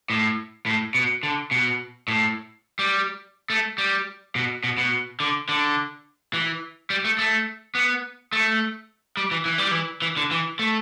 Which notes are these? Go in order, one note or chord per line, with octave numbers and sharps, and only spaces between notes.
A2
A2
B2
D3
B2
A2
G3
A3
G3
B2
B2
B2
D3
D3
E3
G3
A3
A3
B3
A3
G3
E3
E3
G3
E3
E3
D3
E3
A3